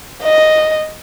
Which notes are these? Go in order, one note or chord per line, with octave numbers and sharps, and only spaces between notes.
D#5